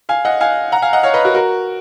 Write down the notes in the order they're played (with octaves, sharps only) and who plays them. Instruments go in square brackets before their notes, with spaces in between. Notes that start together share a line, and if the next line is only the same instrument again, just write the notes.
[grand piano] F5 G#5
D#5 F#5
F5 G#5
F#5 A#5
F5 G#5
D#5 F#5
C#5 F5
B4 D#5
F#4 A#4
F#4 A#4